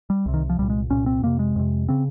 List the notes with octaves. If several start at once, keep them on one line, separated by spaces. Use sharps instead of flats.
G3
C2 C3
D#3
F3
C2 A#2 G3
G#3
C2 A#2 C#4
C4
F2 C3 A#3
G#3
F2 C3
C#3 C4